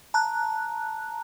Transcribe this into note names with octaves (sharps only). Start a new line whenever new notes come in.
A5 A#5 F#6